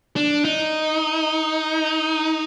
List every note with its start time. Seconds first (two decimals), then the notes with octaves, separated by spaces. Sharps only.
0.16 D4
0.45 D#4